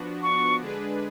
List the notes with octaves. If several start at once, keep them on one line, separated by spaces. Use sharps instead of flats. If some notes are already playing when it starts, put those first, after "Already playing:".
Already playing: F3 B3 D4 F#4
C#6
D3 G#3 D4 G#4 B4